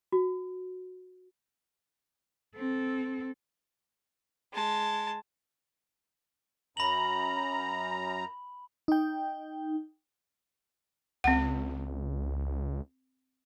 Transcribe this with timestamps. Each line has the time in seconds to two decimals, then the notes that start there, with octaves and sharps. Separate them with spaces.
0.12 F#4
2.56 C4 A4
4.54 G#3 A5
6.77 F#2 A#5 B5 F#7
8.88 D#4 G5
11.24 C#2 C4 F#5